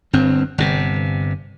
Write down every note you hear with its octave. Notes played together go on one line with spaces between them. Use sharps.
G1 G2 C4
G1 C3